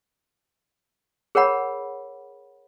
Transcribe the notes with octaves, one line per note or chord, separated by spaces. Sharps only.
G#4 A#4 C#5 F#5 B5